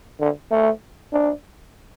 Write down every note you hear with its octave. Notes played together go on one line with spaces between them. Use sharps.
D3
A3
D4